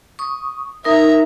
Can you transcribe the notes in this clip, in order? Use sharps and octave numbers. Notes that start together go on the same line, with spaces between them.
C#6 D#6
D#4 A#4 E5 A#5 D#6